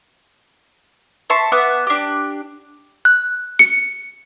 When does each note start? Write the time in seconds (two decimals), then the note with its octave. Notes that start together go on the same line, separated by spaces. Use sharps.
1.30 E5 A5 C6 C#6
1.52 B3 E5 F#5 D6
1.87 D4 G4
3.05 F#6
3.59 C#7